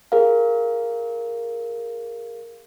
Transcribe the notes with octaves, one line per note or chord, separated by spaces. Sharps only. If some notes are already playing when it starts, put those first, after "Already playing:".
G#4 A#4 F5